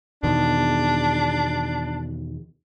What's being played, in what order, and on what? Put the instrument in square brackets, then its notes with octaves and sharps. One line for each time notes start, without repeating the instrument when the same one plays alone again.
[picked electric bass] E2 B2 D#3 [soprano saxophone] D4